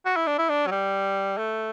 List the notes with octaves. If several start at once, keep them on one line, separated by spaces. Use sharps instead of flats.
F#4
E4
D4
E4
D4
F#3
G3
A3